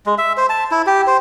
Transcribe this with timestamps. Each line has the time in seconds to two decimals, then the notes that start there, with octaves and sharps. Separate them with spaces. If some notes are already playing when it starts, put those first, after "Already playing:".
0.06 G#3
0.18 E5
0.37 C5
0.49 A5
0.71 E4
0.86 G4
1.07 C5